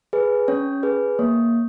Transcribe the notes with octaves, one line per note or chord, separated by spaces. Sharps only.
G#4 B4
C#4 C#5
G#4 B4
A#3 C#5